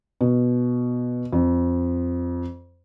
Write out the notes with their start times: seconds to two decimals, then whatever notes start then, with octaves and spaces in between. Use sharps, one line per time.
0.21 B2
1.33 F2